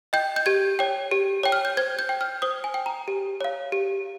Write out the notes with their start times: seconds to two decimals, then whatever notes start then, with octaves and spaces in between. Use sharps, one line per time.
0.13 D#5 G5 G6
0.36 G6
0.46 G4 G#6
0.79 C#5 G5
1.11 G4
1.43 C#5 G5
1.52 F6
1.65 G6
1.77 C5 G#6
1.99 G6
2.09 G5
2.21 F6
2.42 C5 D#6
2.64 G#5
2.74 G5
2.86 A#5
3.08 G4
3.41 C#5 F5
3.72 G4